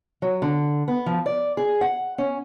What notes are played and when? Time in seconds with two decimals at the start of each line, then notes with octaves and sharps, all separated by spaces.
0.22 F#3
0.42 D3
0.88 B3
1.06 F3
1.26 D5
1.57 G#4
1.81 F#5
2.18 C#4